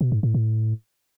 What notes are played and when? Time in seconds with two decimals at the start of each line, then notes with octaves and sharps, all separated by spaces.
0.01 B2
0.12 G#2
0.23 A2
0.35 A2